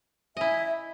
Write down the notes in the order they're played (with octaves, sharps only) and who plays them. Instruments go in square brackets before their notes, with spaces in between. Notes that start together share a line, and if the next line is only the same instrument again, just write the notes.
[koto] E4 D#5 [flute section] E5 G#5